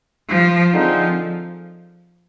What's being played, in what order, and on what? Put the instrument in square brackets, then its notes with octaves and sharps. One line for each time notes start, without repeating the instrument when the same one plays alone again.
[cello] F3
[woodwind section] D3 G#3 C4 D#4 [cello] F3